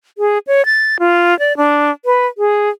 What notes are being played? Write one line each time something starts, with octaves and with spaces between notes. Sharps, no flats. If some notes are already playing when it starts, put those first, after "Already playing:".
G#4
C#5
A6
F4
D5
D4
B4
G#4